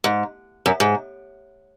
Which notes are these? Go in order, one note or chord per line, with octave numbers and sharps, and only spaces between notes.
G#2
F#2
G#2